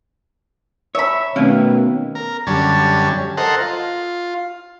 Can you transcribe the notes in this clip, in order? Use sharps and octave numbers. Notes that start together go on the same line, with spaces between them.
C#5 E5 B5
B2 D#3 A3 C4 C#4 F5
A#4
F#2 D3 G3 C#4 G#5 A5
A4 A#4 C5 D#5 F#5
F4